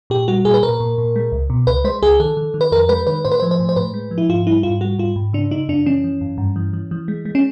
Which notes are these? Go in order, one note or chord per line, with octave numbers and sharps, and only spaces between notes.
A#2 G4
G3 F#4
A#2 G#4
B4
A#2 A#4
A#2
A#2
G#3
C#2
B2
C#2 B4
G#3 C5
C#2 G#4
D#3 A4
D#3
D#3
B4
F2 A#4
G#3 B4
D#3 B4
A2 C5
B4
F3 C5
C5
A2
C5
A2 B4
G#3
F3
E4
G#2 F4
G3 E4
G#2 F4
G3 F#4
G#2 F4
G#2
C#3 D4
C#3 D#4
F#2 D4
E3 C#4
E3
F#2
G2
E3
E3
E3
G#3
G#3
C#4